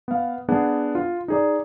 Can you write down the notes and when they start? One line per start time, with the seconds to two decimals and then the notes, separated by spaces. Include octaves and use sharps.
0.08 B3 F5
0.49 B3 D4 G#4 F#5
0.95 F4
1.28 D#4 G#4 D5